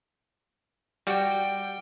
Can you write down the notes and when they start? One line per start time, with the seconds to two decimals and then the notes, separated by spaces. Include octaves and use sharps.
1.07 G3 F#4 G5